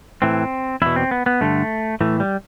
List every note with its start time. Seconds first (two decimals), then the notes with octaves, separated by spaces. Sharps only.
0.22 A2 E3 C4
0.82 E2 B2 E4
0.96 C4
1.11 B3
1.26 B3
1.41 G2 D3 A3
2.01 A2 E3 A3
2.20 G3